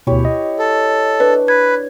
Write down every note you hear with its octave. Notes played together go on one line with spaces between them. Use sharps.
D2 B2 E4 G4 C#5
D#5
A4
D4 B4
B4 G#6